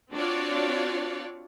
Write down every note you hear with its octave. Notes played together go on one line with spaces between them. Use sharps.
C4 D4 F4 F#4 C#5 D5